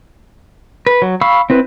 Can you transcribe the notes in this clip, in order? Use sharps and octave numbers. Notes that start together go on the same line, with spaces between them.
B4
F#3
F5 B5 C#6 E6
C4 E4 B4